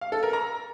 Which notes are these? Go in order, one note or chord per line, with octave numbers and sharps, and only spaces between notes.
F5
A4
A#4
A#5